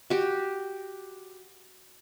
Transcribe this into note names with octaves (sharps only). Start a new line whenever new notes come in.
F#4 G4